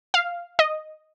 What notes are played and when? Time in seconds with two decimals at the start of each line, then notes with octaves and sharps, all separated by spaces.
0.14 F5
0.59 D#5